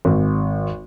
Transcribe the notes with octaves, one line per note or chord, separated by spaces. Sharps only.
G#1